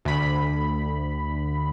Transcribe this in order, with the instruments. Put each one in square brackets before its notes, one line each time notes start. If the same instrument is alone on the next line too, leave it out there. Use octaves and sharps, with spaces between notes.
[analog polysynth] D2 B5